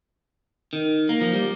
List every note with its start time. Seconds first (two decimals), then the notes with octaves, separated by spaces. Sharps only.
0.73 D#3
1.09 A#3
1.21 F3
1.34 G3